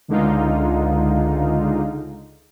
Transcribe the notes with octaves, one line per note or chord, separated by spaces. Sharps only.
C#2 D3 G#3 D#4 F4